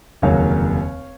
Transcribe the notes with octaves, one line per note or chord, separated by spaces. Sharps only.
F1 D#2 C#3 F#3 A#3 C#5 F5